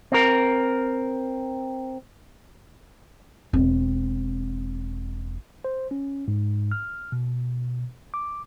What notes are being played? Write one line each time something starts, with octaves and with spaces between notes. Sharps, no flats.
C4 A#4
E1 C4
C5
C#4
G#2
F6
B2
D6